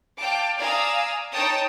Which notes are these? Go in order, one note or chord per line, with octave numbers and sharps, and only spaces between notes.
F5 G5 A5 D6
D5 F5 G#5 A#5 D#6 E6
D#4 C#5 G5 A5 D#6